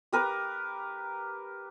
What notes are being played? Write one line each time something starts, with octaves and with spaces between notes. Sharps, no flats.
G4 A#4 B4